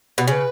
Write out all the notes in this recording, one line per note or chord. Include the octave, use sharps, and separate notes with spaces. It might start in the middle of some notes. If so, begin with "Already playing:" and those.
B2
C#3 B4 C#5